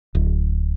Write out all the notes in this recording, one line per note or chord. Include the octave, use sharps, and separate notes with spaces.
D1